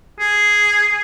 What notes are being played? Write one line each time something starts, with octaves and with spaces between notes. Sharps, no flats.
G#4